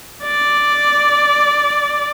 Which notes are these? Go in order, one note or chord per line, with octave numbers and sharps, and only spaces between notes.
D5